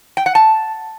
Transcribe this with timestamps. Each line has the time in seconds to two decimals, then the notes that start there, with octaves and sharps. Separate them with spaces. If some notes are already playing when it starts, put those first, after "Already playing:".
0.17 G5
0.26 F#5
0.35 A5